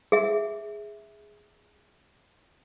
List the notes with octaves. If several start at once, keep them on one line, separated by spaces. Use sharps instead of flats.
G#4 E5